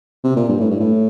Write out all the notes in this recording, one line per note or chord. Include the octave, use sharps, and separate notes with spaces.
C3
A#2
G2
A2
G2
A2